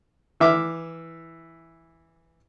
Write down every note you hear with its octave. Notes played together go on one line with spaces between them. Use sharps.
E3 E5 D6 F6